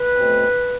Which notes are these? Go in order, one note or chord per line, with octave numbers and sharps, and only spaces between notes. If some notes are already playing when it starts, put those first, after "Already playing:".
Already playing: B4
B2 A3 C4